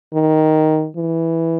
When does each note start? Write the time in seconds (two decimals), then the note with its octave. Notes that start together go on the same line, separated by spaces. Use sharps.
0.14 D#3
0.96 E3